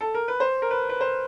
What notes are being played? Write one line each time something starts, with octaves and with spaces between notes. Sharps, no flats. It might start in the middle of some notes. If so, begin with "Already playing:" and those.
A4
A#4
B4
C5
A#4
B4
B4
C5